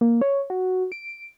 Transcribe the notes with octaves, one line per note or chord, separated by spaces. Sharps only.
A#3
C#5
F#4
D7